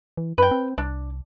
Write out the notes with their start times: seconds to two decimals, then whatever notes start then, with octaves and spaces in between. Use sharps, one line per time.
0.17 E3
0.38 F#2 B4 G5
0.51 C4
0.78 C2 D4